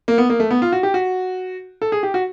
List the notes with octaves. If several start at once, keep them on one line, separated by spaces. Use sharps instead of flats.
A#3
B3
A#3
A3
B3
F4
F#4
G4
F#4
A4
G#4
G4
F#4